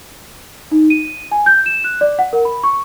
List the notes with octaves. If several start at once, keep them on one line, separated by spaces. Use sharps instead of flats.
D#4
D#7
G#5
G6
E7
F#6
D5
F#5
A#4
B5
C#6